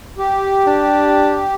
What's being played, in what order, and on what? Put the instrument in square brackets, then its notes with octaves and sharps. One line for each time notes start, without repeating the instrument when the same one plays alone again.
[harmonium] G4
[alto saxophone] D4